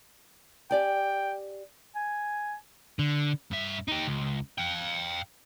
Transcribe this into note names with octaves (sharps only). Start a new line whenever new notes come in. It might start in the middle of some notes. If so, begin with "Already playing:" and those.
G4 D5 G5 G#5
G#5
D3
G2 E5
D#4 G4
C#2
F5 G5